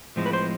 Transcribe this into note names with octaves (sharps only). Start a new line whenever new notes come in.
A2 F3 G#3 C4
B4
C5